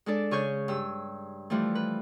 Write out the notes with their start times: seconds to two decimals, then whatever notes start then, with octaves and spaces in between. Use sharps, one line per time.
0.06 G#3 D4 A4 D5
0.31 C#3 G#4 C#6 G6
0.68 G2 E6
1.50 E3 F3 G3 A3
1.75 B4